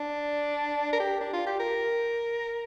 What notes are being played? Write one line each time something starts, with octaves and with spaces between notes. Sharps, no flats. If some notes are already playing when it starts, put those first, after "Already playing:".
Already playing: D4
A#4
G4
D4
F4
G4
A#4